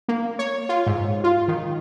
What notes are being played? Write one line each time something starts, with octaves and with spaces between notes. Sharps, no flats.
A#3
C#5
F4
G#2
F4
D#3